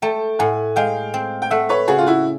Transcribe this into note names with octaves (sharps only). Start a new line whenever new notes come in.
A3 G5 A5
A2 F#5 G#5
G#3 F5 G5
C4
G5
A3 E5 F#5
B4 C#5
C#3 F#4 G#4
F4
E4 F#4